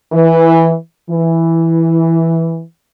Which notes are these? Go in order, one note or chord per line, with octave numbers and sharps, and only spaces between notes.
E3
E3